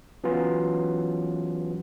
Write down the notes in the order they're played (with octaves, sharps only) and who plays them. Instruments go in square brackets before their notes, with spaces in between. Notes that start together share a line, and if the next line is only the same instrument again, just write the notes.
[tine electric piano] E3 F#3 B3 C#4 F4